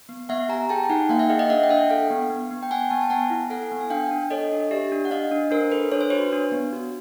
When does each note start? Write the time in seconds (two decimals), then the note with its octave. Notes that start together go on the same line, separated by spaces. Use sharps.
0.09 B3
0.29 B3 E5 F#5
0.49 G4 G#5 A#5
0.69 G#4 G5 A5
0.89 D#4 F#5 G#5
1.09 A#3 F5 G5
1.19 E5 F#5
1.29 G#4 D#5 F5
1.39 D#5 F5
1.49 D4 E5 F#5
1.63 G5
1.69 D4 E5 F#5
1.90 A4 F5 G5
2.10 B3
2.30 B3
2.51 B3
2.63 G5
2.70 B3 F#5 G#5
2.90 B3 G5 A5
3.01 A5
3.10 B3 F#5 G#5
3.30 E4
3.50 A4 F#5 G#5
3.71 B3
3.81 G#5
3.90 D4 F5 G5
4.11 D4
4.30 A4 C#5 D#5
4.52 D4
4.71 G4 D5 E5
4.92 D4
5.05 F#5
5.11 D4 D#5 F5
5.31 D4
5.51 D4 A#4 C5
5.72 A4 B4
5.92 D4 C#5
6.01 C5
6.10 F#4 B4 C#5
6.32 D4
6.52 B3
6.73 F#4